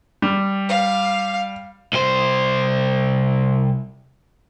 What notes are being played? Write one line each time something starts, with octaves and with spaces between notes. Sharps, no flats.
G3
F5
C2 C5